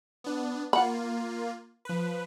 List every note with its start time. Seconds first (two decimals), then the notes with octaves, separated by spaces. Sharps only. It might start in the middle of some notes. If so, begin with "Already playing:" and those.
0.24 B3 D4
0.73 A#3 F4 F#5 B5
1.85 F3 B4